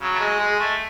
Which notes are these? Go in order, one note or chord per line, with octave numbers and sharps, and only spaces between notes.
C#3 F#3
A3
G#3
G#3
A3